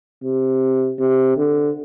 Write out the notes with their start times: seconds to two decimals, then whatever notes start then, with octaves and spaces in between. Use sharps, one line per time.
0.23 C3
0.99 C3
1.37 D3